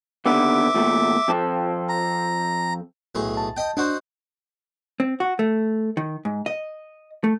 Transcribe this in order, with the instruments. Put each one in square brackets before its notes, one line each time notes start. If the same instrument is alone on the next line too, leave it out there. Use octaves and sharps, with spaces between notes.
[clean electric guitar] D#2 D3 B3 [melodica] E5 D6
[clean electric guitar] E2 A#2 A3
F2 C4 A4
[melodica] A#5
[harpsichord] B1 A2 G#4
[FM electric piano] A5
[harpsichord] D#5 G5
[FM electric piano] D4 [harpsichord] D#4 F#4 C5
[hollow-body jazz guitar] C4
F#4
A3
D#3
G#2
D#5
A3